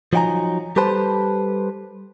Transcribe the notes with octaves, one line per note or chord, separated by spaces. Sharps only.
F3 F#3 D#4 G5 G#5 A#5
G3 G4 A4 B4 C5 A5